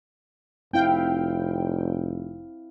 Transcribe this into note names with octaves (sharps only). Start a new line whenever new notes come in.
F1 C4 E4 F5 G5